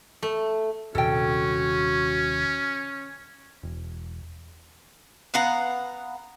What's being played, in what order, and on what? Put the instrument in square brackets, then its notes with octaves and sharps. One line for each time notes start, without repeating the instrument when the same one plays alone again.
[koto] A3
[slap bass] D#1 C3 [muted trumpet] C#4 [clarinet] F#4 [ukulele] A4 G5
[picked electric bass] E1
[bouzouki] B3 F5 F#5 A#5